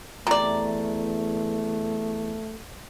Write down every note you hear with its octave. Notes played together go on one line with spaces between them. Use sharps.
E2 C3 A3 D5 A#5